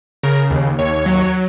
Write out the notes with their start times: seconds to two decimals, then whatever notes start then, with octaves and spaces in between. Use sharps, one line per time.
0.23 C#3 A#4
0.51 D#2
0.79 D#2 C#5
1.06 F#3